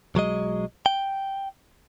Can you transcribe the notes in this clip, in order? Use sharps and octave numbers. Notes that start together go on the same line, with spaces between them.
B1 F#3 G#3 D#5
G5